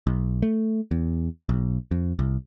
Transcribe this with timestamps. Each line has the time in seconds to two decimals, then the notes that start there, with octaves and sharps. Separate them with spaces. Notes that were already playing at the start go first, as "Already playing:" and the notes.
0.07 B1
0.42 A3
0.91 E2
1.49 B1
1.91 F2
2.19 C2